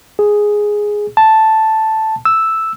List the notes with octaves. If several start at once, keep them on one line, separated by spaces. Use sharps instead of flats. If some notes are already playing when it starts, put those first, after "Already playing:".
G#4
A5
E6